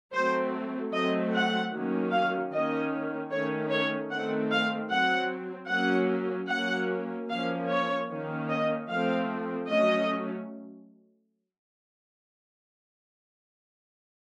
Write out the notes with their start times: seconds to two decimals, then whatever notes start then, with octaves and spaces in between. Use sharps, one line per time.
0.13 F#3 A3 C4 C5
0.93 F#3 A3 C4 D#5
1.33 F#5
1.73 D#3 F#3 A#3 C#4
2.12 F5
2.52 D#3 A#3 C#4 D#5
3.31 D#3 A3 C#4 C#5
3.71 C#5
4.11 D#3 A3 C4 F#5
4.51 F5
4.90 F#3 C4 F#5
5.70 F#3 A#3 C#4 F#5
6.50 F#3 A#3 C#4 F#5
7.29 F3 A#3 C#4 F5
7.69 C#5
8.08 D#3 A#3 C#4
8.49 D#5
8.89 F3 A3 C4 F5
9.67 F#3 A3 C#4 D#5